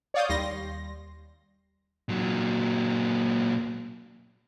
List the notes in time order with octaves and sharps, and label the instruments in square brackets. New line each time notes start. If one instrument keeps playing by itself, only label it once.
[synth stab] C#5 D5 F5 D#6 G6
D#2 G3 C6 A#6
[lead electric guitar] A#2 F#3